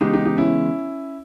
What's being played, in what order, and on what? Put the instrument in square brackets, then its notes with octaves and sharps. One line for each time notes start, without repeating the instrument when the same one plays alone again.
[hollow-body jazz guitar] E2 C#3 G#3 B3 [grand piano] D#4 G4
[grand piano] D#4 G4
D#4 G4
C#4 E4